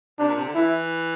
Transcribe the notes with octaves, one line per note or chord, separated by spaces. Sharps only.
C3 D4
A#2
C3
D3
E3 E4